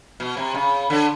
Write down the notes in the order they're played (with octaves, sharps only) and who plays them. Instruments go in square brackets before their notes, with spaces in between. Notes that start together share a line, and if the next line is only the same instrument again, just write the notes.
[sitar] B2
C3
C#3
D3